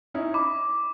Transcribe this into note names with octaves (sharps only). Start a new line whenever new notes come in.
C#4 D#4 E4
B5 D6